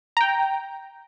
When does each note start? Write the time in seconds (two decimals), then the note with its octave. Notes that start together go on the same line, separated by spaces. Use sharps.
0.17 G5 A#5